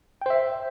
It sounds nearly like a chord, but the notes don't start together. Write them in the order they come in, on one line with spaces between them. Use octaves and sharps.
G5 C5 E5